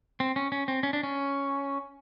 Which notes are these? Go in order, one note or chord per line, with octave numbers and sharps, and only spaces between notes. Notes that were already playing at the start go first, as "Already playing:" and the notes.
C4
C#4
C#4
C4
C#4
D4
C#4